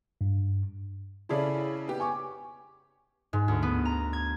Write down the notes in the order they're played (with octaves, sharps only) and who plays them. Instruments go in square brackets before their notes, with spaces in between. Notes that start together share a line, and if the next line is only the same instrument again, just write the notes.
[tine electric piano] G2
[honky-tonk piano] C#3 A4 [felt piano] E4 G#4 D5
[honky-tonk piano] B3 G4
[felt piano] G#5 C#6 D6
[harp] G#2
D2
B3
A#5
G#6